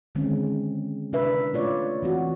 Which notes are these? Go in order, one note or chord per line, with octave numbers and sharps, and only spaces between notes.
D3 D#3 G#3 C4 C#4
C3 D4 A#4 B4 E5
A3 F4 C#5 D5
E3 C4 F#4